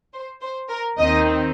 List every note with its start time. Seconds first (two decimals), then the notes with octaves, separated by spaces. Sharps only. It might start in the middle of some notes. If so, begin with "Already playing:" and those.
0.14 C5
0.42 C5
0.70 A#4
0.98 D#2 D#3 C4 D#4 D#5